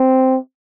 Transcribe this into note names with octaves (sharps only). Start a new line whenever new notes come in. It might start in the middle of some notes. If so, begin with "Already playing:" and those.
Already playing: C4